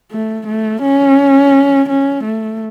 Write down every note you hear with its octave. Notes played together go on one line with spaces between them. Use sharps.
A3
A3
C#4
C#4
A3